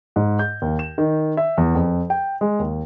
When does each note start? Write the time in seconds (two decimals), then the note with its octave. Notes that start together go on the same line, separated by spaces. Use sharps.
0.16 G#2
0.39 G6
0.62 D#2
0.79 E7
0.98 D#3
1.37 E5
1.58 E2
1.75 F2
2.10 G5
2.41 G#3
2.59 D#2